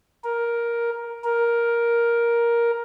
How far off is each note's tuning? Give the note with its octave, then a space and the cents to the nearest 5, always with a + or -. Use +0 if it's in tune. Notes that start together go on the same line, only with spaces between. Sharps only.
A#4 +10
A#4 +10